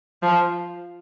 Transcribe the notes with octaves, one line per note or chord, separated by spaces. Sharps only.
F3